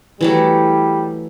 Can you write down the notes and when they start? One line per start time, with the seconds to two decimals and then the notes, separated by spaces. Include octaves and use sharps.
0.21 E3 F#3 G3 A3